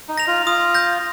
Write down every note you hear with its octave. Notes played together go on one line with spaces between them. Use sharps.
D#4
A#6 F7
F4
F4 D#6
G6 A#6